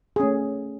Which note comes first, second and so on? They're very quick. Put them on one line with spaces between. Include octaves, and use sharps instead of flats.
G#4 C#4 A3